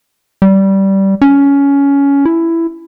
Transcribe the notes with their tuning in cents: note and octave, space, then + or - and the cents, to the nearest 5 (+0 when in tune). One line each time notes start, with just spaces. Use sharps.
G3 -15
C#4 +15
E4 +10